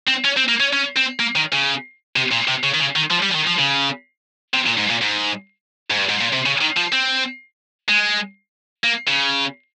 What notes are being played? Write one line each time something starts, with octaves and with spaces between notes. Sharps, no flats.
C4
C#4
C4
A#3
C#4
C#4
C4
A#3
D#3
C#3
C3
A#2
C3
C#3
D#3
C#3
D#3
F3
G3
F3
D#3
F3
C#3
C3
A#2
G#2
A#2
G#2
G#2
G2
G#2
A#2
C3
C#3
D#3
F3
C4
G#3
A#3
C#3